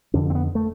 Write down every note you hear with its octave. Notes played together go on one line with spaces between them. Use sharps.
F2 D3 C#4
C4
B3
A3